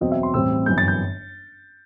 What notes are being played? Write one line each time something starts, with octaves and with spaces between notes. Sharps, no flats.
E2 B2 F#3 C4 D#5
E5
C6
A1 A2 G3 C4 E6
G1 F#2 E3 G6
A6
G6